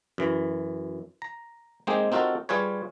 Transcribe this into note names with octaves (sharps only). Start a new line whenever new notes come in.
F#2 E3
A#5
G#3 A#3 C4 D#4 G4 G#4
C4 D#4 F4 F#4 A4 A#4
G3 F4 G#4 B4 C#5